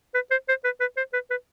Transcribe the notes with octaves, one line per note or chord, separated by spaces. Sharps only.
B4
C5
C5
B4
B4
C5
B4
B4